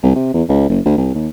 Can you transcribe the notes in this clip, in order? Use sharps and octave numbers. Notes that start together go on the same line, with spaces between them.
C2
C3
E2
C#2
F#1
D2
C2
D#2